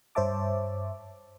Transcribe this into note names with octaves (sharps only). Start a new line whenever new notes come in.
G2 C5 C#5 E5 A5 D6